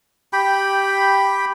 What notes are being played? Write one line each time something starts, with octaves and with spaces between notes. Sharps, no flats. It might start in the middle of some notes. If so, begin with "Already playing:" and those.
G4 G5 B5